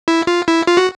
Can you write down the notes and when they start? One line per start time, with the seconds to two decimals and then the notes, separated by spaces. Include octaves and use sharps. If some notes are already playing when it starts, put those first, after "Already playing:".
0.08 E4
0.27 F4
0.48 E4
0.67 F4
0.77 F#4